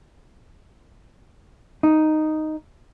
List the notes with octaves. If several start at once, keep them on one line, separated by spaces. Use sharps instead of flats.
D#4